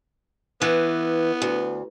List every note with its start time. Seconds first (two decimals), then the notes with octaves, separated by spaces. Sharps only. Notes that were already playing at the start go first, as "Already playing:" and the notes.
0.62 E3 B3
1.42 D2